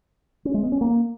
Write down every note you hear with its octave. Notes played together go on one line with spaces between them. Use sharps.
C#4
G#3
B3
C#4
A#3